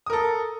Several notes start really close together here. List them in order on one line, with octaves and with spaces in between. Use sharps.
D#6 A#4 A4